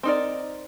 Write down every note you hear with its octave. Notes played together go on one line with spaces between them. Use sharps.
C4 D#4 A#4 D5